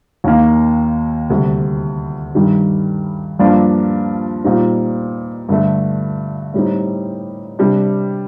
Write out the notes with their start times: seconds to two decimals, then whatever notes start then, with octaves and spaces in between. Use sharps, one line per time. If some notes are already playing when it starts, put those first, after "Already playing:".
0.24 D#2 D#3 A#3
1.30 D2 C3 G3
2.35 G2 D#3 G3
3.39 G2 F3 A#3 D4
4.44 A#2 G3 C4 D#4
5.49 G2 D3 A3
6.54 A2 G3 C4 D#4
7.59 C3 G3 D4